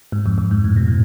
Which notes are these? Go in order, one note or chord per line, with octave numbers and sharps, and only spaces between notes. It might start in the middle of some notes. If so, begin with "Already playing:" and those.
G#2
F2
F2
G#2
A2
B2
A2